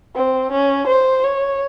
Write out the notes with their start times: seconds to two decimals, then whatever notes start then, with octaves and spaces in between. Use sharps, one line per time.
0.15 C4
0.51 C#4
0.87 C5
1.23 C#5